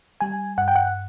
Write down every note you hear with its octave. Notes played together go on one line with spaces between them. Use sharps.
G3 G#5
G2 F#5
G5
F#5